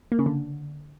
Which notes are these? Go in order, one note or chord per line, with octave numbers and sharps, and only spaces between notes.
A#3
C#3
D3